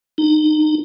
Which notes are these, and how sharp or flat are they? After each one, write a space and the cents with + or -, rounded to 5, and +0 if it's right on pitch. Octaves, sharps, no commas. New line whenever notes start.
D#4 -25